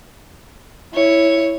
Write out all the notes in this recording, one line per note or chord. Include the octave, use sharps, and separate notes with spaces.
E4 C#5